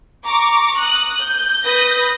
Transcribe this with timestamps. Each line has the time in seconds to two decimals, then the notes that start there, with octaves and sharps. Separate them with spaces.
0.24 A#5 C#6 D6
0.79 D#6 F#6
1.20 G6
1.64 B4 D#6 G6 A#6